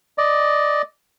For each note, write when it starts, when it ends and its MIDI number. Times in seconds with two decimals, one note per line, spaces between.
0.18 0.82 74
0.18 0.82 75